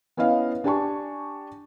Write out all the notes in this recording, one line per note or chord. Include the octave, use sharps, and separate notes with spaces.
B3 C#4 E4 D#5 F5
D4 G4 G#5 A5 C#6